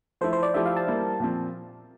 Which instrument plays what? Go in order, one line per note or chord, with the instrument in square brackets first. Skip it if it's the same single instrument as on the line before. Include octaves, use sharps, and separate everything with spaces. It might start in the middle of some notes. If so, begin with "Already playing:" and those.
[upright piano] F3 A3 E4 [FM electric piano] C5
[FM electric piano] C5
D5
[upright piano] F3 A3 E4 G4 [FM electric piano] E5
[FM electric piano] F5
A5
[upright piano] G3 A#3 E4
A#2 F3 C4